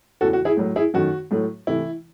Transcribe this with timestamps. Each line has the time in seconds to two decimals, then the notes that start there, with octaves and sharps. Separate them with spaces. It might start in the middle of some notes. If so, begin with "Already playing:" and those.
0.21 E2 C#3 E3 A3 F#4 A4
0.33 F#4
0.45 E4 G#4
0.57 A2 F#3 A3
0.76 E4 G#4
0.94 F#2 D#3 A3 F#4
1.31 A2 F#3 A3
1.67 C3 E3 A3 E4